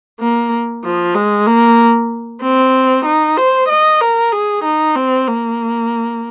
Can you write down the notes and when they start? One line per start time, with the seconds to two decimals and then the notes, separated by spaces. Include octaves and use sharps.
0.20 A#3
0.84 F3
1.15 G#3
1.47 A#3
2.41 C4
3.06 D#4
3.37 C5
3.69 D#5
4.01 A#4
4.32 G#4
4.64 D#4
4.95 C4
5.27 A#3